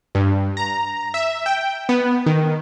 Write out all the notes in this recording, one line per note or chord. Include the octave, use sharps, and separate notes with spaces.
G2
A#5
E5
G5
B3
D#3